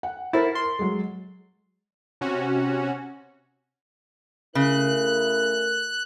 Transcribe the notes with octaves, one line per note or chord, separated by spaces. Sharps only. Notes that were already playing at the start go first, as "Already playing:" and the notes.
F#5
E4 A#4 C5 A6
C6
F#3 G#3
C3 C#4 F#4
C#3 A3 E4 A#4 F#6